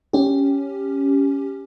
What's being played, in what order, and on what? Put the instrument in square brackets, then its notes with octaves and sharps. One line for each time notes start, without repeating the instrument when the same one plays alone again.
[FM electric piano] C#4 G4